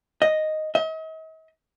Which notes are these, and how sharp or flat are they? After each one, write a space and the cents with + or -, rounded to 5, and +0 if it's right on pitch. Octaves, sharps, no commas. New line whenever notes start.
D#5 +0
D#5 +45